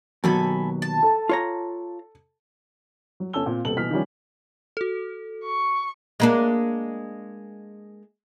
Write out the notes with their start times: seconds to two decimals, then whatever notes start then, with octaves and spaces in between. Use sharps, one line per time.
0.24 D#2 B2 F#3 A4 G#5 B5
0.82 A5
1.03 A4
1.29 F4 C#5 A#5
3.20 F#3
3.33 G1 C#4 A4 A5 E6 G7
3.46 A#2 C4 F5
3.65 D#1 B2 A4 F#7
3.77 B2 E3 F6 B6
3.90 D#3 F3 G3 C#4
4.77 F#4 A4
5.45 C#6
6.20 G#3 A#3 D4